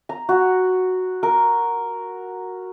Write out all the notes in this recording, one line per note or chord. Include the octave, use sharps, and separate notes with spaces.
A#5
F#4
A#4